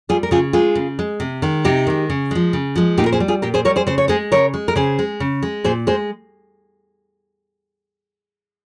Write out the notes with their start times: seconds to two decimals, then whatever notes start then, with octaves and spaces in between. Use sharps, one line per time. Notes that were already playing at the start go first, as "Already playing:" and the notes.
0.09 G3 F4 G#4
0.23 A#4
0.31 C#3 F4 G#4
0.53 G#3 F4 G#4
0.75 C#3
0.99 G#3
1.20 C3
1.42 D#3 G#3
1.65 C3 D#4 G4
1.87 D#3 G#3
2.10 C#3
2.31 F3 G#3
2.53 C#3
2.76 F3 G#3
2.98 A#2 D#4 G4
3.06 A#4
3.12 G#4 C5
3.20 G3
3.28 F4 G#4
3.42 A#2 G4 A#4
3.54 G#4 C5
3.65 G3 A#4 C#5
3.76 G#4 C5
3.87 C#3 C5
3.98 C#5
4.08 G#3 G#4 C5
4.32 C#3 A#4 C#5
4.54 G#3
4.68 A#4
4.76 C#3 G#4 C5
4.99 G#3
5.20 C#3
5.43 G#3
5.64 A#2 G#4 C5
5.87 G#3 G#4 C5